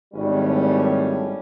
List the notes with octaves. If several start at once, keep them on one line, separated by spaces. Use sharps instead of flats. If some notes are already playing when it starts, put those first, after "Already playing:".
G#1 A2 G3 C#4